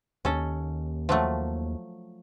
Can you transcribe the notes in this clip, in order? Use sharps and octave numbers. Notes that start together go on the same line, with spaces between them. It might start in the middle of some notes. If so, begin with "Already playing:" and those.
D#2 C#4 A4
F3 F#3 A3